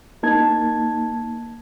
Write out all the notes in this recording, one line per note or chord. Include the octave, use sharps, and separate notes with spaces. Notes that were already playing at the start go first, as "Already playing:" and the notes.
A#3 D#4 A5 G#6